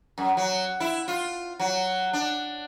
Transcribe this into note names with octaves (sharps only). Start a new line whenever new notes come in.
F#2
F#3
E4
F4
F#3
D4